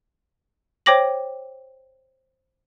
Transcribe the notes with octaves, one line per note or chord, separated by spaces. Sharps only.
C5 C#5 G5 D6 A#6 F#7